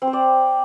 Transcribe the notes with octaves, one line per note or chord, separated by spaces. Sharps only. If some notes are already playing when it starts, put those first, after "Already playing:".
C4
C5
D5